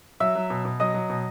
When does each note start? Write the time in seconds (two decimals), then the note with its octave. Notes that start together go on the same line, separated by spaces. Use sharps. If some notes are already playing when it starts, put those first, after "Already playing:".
0.20 F#3 E5 E6
0.35 F#3
0.50 B2
0.65 B2
0.80 F#3 D#5 D#6
0.94 F#3
1.09 B2